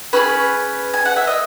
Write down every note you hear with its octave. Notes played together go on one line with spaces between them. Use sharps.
C#4 E4 G#4 B4
G#5
F#5
E5
D#5